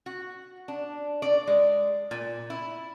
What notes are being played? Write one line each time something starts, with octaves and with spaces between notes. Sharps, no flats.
F#4
D4
D5
G#3
A#2
E4